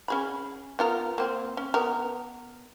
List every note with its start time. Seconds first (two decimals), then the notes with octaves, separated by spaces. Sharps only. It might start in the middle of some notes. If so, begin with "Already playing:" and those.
0.08 C#4 G#4 B5
0.79 B3 F4 A#4
1.18 A#3 C4
1.57 C#4
1.74 B3 A#4